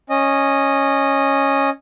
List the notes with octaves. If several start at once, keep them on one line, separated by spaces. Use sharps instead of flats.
C#4 D#5